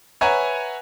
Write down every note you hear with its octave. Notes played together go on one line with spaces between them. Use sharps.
B4 C#5 E5 F#5 G#5 A#5